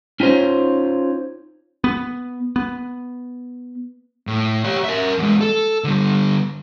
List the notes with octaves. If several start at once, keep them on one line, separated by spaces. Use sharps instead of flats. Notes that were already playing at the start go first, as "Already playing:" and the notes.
C#4 D#4 F4 C5 C#5
B3
B3
A2
G4 C#5
A#4 E5
E2 G#3
A4
D3 G3